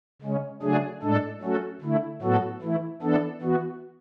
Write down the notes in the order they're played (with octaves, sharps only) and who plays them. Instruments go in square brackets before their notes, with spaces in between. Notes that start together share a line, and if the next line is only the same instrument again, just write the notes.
[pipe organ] C#3 G#3 C#4
C#3 F#3 A3 D4 G#4
A2 G#3 D4 A4
F#3 A3 C#4 F#4 A4
D3 A3 E4
A2 F#3 B3 F#4 A4
E3 A3 E4
E3 B3 D4 A4
E3 B3 F#4